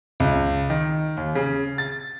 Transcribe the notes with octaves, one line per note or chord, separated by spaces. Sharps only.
C#2
D#3
D#2
C#3
A6